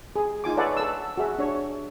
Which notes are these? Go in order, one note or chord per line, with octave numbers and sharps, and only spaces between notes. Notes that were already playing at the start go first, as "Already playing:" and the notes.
G#4
D#4 F4 G#5 D6
A4 B4 C#5 D5 F5 F#5
A4 E6
F#4 G#4 E5
D4 C#5